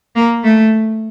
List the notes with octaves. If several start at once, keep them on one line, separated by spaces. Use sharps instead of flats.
A#3
A3